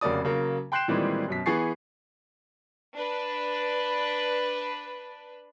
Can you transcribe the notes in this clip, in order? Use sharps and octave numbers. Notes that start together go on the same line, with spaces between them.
F1 C#3 A#3 F#4 D5 D#6
C#3 F#3 A#3
G5 C6 F#6 G6 C7 E7
A#2 D#3 E3 G3 G#3 C4
F#2 B2 B6
E3 B3 G#4 C#6 A6 C7
D4 B4